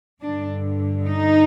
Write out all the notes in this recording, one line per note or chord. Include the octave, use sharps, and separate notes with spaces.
G2 D3 D4
D#4